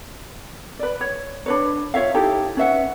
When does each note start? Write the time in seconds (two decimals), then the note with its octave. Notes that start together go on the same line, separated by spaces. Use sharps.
0.79 B4 D5
1.01 C#5
1.46 D4 B4 C#5
1.94 F4 C#5 E5 F5
2.14 D#4 E4 G4 A4
2.57 C#4 B4 E5 F#5